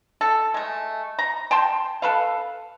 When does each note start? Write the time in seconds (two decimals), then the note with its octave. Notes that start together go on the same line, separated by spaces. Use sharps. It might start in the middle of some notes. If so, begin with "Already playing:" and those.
0.21 A4
0.54 G#3 A3
1.19 A#5
1.51 G5 A5 C6
2.02 A4 B4 F5